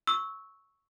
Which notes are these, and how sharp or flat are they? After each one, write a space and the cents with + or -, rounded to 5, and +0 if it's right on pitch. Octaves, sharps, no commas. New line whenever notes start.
C#6 +0 E6 -15